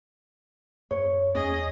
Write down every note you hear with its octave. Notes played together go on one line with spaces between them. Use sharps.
F#2 C#5
E2 C#4 G#4 D#5